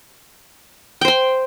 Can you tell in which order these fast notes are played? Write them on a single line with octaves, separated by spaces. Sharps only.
G5 C5 C6